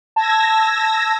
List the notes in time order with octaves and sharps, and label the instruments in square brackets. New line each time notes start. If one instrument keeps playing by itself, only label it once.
[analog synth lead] A5 [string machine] E6 G#6 A#6